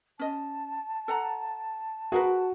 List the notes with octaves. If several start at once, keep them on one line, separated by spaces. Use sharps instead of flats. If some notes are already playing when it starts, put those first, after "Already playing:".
C#4 D#5 A5
A4 F#5 A#5
F#4 G#4 A#4 B4